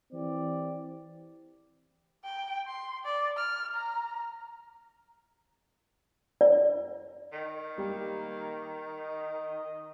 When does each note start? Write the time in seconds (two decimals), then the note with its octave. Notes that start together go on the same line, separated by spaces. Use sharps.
0.12 E3 C4 G4 D5
2.25 G5
2.67 C6
3.05 D5
3.37 F6
3.75 A#5
6.41 D5
7.32 D#3
7.78 G3 A#3
8.98 D#5